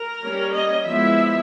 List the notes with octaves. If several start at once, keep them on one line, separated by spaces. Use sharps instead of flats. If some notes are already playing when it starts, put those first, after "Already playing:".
Already playing: A#4
G3 A#3 C#4
D#5
F3 G#3 B3 E4 E5